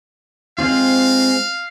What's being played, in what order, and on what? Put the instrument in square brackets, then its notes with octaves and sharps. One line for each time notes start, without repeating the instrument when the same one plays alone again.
[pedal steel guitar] G#3 C4 F4 [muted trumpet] F5